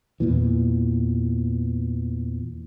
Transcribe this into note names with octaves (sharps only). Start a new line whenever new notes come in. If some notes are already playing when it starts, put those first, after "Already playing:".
E2 A#2 E3